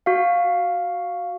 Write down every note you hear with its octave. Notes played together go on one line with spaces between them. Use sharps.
F#4 F5